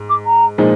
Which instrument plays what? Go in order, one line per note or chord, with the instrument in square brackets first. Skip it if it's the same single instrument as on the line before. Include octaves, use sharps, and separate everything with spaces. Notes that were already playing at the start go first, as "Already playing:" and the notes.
Already playing: [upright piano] G#2
[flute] D6
A#5
[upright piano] A#2 F3 G#3 D#4